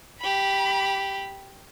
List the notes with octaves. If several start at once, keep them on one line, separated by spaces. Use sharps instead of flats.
G4 B5